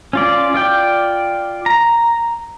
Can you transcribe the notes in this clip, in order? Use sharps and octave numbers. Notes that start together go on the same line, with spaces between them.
C#4 F4 D5
F4 D5 G5
A#5